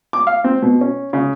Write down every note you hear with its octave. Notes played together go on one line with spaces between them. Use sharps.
D6
F5
C4
B2
C#4
C#3